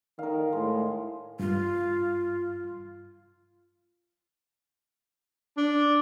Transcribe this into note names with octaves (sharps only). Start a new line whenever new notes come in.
D#3 A#4 F5
A2 G#3
G2 F4
D4